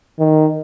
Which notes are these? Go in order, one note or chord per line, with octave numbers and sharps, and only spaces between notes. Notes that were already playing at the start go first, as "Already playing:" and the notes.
D#3